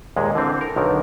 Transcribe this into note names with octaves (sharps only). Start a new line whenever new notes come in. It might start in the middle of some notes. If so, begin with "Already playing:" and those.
D#2 A#2 G#3
D3 E3 C4
A4 A#4
B1 D3 D#3